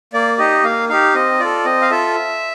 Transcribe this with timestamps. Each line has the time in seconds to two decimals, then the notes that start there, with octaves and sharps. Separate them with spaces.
0.13 A#3 D5
0.38 D#4 G4 D#5
0.64 A#3 F5
0.89 D#4 G4 F5
1.14 C4 D#5
1.40 F4 A4 D5
1.65 C4 D#5
1.82 F5
1.90 F4 A4 E5